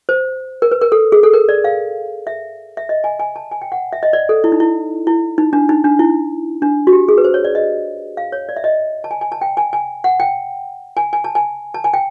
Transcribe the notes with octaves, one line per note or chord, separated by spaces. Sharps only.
C5
A#4
B4
A#4
A4
G#4
A4
A#4
D5
F5
E5
E5
D#5
G#5
G#5
A5
G#5
G5
F#5
E5
D#5
D5
A4
E4
D#4
E4
E4
D#4
D4
D#4
D4
E4
D4
F#4
G4
G#4
B4
C5
C#5
D5
D#5
F5
C#5
D5
E5
D#5
A5
G#5
G#5
A5
G5
G#5
G#5
F#5
G5
G#5
G#5
A5
G#5
A5
G#5
G5